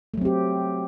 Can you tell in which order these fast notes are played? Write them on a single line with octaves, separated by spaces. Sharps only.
A3 F#3 C4 G4